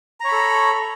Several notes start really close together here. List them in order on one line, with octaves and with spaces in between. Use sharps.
A#5 C#5 B5 A4